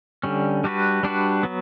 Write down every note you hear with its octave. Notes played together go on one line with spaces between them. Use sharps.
D3 G3 C#4
G3 D4 F#4 B4
G3 D4 F#4 B4
F#3 B3